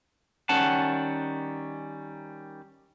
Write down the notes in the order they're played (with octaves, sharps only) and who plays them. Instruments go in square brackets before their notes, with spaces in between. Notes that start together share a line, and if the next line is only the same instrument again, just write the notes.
[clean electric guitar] D#3 G3 C#4 F#5 A5